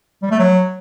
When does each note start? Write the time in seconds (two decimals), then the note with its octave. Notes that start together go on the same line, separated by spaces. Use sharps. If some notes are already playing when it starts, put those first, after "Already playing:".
0.22 G3
0.31 A3
0.39 F#3